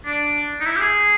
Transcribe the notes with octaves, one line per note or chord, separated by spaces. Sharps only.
D4
D#4
E4
G4
G#4